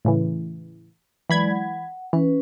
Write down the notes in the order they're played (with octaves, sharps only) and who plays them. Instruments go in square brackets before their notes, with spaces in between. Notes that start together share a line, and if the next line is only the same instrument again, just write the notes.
[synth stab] A2 C#3 E3
[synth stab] E3 B5 G#6 [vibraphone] F#3 G#3 D5
[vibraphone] F#5
[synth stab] E3 [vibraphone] C#4 B4